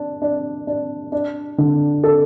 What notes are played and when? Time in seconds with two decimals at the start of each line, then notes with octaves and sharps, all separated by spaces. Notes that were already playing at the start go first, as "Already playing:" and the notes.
Already playing: D4
0.22 D4
0.67 D4
1.12 D4
1.58 D3
2.04 A4